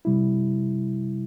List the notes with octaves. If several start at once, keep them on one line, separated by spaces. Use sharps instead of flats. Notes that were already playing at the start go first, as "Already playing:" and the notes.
C3 G3 E4